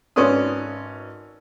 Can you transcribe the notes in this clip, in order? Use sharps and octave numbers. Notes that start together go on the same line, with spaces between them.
G#1 C#4 B4 D5 C6 D#6